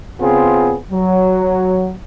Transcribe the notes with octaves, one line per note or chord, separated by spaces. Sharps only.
C#3 B3 C4 F4 G#4
F#3